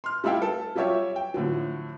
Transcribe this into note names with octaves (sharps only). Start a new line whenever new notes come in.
C6 F6
G3 A3 E4 E5 F5 G5
A4
F#3 G3 F4 G4 C#5 E5
G5
A2 D3 F3 F#3